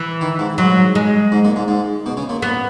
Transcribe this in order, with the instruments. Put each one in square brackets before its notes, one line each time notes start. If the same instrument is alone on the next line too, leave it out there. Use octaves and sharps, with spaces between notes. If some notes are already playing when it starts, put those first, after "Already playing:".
Already playing: [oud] E3
[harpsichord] D#3
G#2
[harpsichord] G#2 [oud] F#3
[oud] G#3
[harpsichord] G#2
A#2
G#2
G#2
B2
C#3
A#2
[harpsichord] A#2 [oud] B3